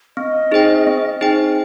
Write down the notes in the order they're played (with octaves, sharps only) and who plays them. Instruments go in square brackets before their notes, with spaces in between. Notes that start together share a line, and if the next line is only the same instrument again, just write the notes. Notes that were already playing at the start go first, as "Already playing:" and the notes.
[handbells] C4 [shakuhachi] D#5
[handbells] D#4 G#4 C5 G5
C4
D#4 G#4 C5 G5